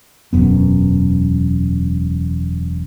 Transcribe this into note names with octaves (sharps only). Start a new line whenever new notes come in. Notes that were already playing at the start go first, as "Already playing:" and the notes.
E1 F#2 B3